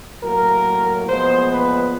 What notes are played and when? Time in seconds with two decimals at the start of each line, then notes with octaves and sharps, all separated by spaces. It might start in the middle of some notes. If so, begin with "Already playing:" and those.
0.23 A2 F#3 A#3 A#4
1.07 A#2 F3 G#3 B3 C5
1.50 B4